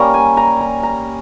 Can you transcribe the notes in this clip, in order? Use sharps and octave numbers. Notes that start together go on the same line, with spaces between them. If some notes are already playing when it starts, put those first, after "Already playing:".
Already playing: G3 A#3 C#4 A#5
G#5
A#5
A#5
A#5